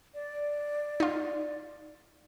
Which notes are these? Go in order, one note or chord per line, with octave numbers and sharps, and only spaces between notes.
D5
D#4 F4